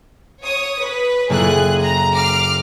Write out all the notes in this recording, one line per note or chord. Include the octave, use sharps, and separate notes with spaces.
C#5 D#6
B4
F#1 A#3 G#4 A4 F#6
A#5
D6 F6 C7